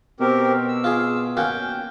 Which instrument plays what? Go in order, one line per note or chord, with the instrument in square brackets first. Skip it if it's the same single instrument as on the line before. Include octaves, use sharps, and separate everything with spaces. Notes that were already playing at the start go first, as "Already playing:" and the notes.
[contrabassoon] B2 [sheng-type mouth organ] C4 G4 A#4
[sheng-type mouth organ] E6
[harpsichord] F4 G#4
[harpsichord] A#3 C#4 F#4 [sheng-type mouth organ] G5